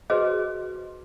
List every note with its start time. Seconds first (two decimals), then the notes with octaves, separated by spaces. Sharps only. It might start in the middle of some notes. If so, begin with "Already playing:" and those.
0.10 F#4 G#4 B4 C5 D#5